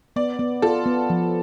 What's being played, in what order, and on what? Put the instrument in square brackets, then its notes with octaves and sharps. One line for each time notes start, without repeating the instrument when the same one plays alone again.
[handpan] B3 [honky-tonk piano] D5
[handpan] B3
[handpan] F4 [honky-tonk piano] A4
[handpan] B3
F3